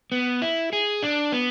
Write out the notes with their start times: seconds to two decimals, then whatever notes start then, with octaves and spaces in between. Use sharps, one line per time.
0.12 B3
0.42 E4
0.73 G#4
1.03 D4
1.32 B3